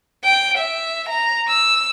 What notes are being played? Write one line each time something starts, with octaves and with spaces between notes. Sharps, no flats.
G5
E5
A#5
E6